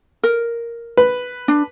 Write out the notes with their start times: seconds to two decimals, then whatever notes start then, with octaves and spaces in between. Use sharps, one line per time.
0.23 A#4
0.97 B4
1.48 D4